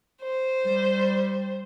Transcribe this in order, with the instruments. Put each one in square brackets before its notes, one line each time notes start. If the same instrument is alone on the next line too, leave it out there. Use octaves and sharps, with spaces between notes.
[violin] C5
[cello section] G3